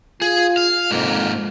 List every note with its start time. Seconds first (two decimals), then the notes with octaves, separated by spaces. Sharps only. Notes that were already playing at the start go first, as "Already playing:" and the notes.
0.22 F4 G#4
0.57 F5
0.91 F2 G#2 A#3